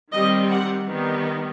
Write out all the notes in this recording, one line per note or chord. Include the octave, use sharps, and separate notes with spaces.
D#3 G3 C4 D#5
F#5
D#3 G3 B3